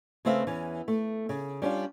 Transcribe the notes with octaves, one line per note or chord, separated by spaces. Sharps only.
C#3 A3 C4 B4 E5 F5
E2 E3 C#4
A3
C#3
G3 C#4 D4 F4